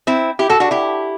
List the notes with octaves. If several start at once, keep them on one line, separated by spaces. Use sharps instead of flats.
C4 E4
E4 G4
F#4 A4
D4 F#4
E4 G4